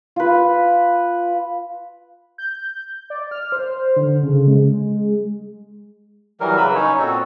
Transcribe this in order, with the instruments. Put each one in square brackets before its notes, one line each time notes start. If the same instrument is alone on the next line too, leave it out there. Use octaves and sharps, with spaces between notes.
[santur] F4 B4
[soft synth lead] G6
D5
F6
C5
D3
C#3
G#3
[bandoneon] E3 F#3 G3 A#4
C#3 F#3 B4 B5 E6
C#4 D#4 C#5
A#2 C4 F#4 A4